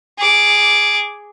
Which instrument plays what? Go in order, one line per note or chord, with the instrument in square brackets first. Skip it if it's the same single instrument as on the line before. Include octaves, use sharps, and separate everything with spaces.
[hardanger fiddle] G#4 D6